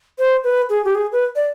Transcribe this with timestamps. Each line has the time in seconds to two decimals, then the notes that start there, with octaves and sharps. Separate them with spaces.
0.19 C5
0.44 B4
0.70 G#4
0.85 G4
0.95 G#4
1.12 B4
1.36 D5